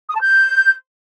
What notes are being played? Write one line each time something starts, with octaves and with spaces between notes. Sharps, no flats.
D#6
A5
G6